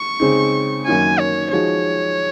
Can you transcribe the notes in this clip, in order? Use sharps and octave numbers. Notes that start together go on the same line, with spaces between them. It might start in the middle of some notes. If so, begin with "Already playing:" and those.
Already playing: C#6
C#3 G#3 C4 D#4
F#2 D#3 A#3 C#4 G#5
C#5
F3 G#3 D#4 F#4 C#5